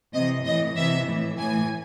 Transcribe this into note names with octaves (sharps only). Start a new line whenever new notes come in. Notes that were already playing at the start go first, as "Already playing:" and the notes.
C3 E3 D#5
A2 E3 D#5
C3 E3 E5
A2 E3
A2 E3 G#5